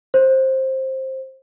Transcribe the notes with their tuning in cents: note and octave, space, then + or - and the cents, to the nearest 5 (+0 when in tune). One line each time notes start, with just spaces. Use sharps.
C5 +15